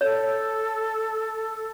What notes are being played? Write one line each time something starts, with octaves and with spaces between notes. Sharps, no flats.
A4 C#5